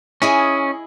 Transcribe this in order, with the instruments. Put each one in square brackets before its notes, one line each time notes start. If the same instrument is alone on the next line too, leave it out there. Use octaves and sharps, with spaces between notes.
[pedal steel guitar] C#4 [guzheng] E4 G#4 D#5